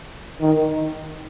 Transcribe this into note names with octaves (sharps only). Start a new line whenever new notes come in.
D#3